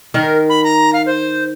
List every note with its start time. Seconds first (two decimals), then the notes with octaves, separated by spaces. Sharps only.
0.14 D#3 A#4
0.49 B5
0.64 A#5
0.93 F5
1.06 C5